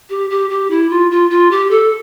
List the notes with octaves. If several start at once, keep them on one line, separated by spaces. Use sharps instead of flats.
G4
G4
G4
E4
F4
F4
F4
G4
A4